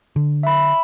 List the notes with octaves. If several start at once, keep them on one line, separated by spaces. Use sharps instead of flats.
D3
E5 B5